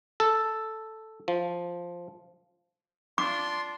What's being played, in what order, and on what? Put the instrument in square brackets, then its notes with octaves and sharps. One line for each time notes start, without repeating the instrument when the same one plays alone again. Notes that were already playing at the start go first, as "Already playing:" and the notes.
[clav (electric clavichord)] A4
F3
[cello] D4 F4 [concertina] C6 [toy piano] D6